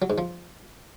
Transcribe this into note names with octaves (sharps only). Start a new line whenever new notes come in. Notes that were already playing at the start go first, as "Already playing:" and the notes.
F#3
G#2
F3